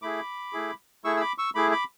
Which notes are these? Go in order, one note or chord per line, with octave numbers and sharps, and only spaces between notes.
A3 E4 G#4 B5 D6
A3 E4 G#4
A3 E4 G#4 C#6 E6
E6
B5 D6
C#6 E6
A3 E4 G#4 B5 D6
B5 D6